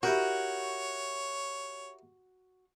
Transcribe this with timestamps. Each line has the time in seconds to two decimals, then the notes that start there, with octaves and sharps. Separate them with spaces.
0.03 E4 F#4 G4 A#4 C#5